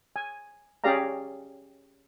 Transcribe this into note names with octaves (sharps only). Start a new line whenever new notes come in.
G#5
C#4 G4 G#4 D5 F5 A#5